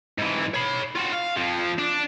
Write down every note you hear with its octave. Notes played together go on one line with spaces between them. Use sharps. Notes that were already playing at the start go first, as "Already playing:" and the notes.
G#2 E3
C#5 B5
F4 F#4
F5
F2 F3
D4